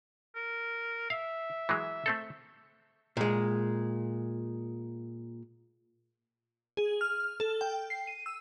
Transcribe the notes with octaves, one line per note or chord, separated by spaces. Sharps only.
A#4
E5 F5
E3 F#3 G#3
A3 C4 A4
A#2 G#3
G#4
F6
A4
G5
C7
D#7
E6